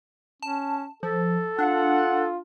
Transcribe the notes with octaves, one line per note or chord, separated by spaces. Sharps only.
C#4 A5
F3 A4
D4 F4 F#5